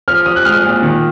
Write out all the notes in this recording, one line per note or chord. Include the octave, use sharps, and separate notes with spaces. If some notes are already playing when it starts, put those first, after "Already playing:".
F3 F6
F3 D#6
F#6
G#3 F6
A#2
D#3